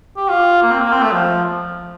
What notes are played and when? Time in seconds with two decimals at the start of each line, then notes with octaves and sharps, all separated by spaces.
0.17 G4
0.29 F4
0.63 A#3
0.71 C4
0.81 A#3
0.92 C4
1.02 A3
1.12 F3